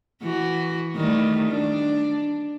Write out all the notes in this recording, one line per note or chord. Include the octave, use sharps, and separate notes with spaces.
E3 F#4
D#3 G3 A3
D4